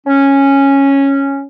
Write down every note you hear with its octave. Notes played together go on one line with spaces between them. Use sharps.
C#4